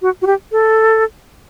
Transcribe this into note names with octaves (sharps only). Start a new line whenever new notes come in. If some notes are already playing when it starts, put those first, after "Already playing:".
F#4
F#4
G4
A4